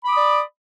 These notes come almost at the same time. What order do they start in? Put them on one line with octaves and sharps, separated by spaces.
B5 D6 D#6 D5